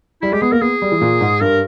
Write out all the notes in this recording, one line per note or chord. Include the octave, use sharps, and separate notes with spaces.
G3 E4
G#3 G4
B3 G#4
A#3 A#4
B3 G#4
G3
E3
A#2
G#2
G2 A#4